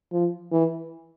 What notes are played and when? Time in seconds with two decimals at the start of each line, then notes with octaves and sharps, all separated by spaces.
0.12 F3
0.52 E3